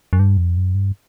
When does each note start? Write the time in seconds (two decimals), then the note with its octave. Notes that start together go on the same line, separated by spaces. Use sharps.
0.13 F#2
0.19 G2
0.37 F2
0.57 F#2
0.75 G2